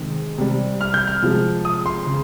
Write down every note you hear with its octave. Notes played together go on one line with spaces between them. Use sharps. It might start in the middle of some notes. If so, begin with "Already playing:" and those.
Already playing: C3 D#3 G#3
C3 G3
F6
G6
F6
C3 F3 G#3
D#6
C6
C#3